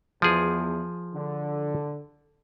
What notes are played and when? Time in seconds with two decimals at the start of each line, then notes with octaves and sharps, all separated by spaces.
0.22 E2 F3 G#4
1.15 D3